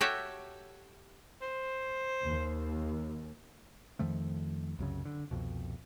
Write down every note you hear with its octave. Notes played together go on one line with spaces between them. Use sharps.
F#4 G4 A4 C#5 E5
C5
D#2
F2 D#3 F3 A3
C2 F#2 C#3
D3
C2 F2 B2